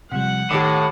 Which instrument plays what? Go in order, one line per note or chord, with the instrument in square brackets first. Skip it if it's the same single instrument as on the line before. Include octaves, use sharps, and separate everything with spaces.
[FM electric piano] C3 F3 G3 [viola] F#5
[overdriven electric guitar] A2 [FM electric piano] D#3 [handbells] G4 D6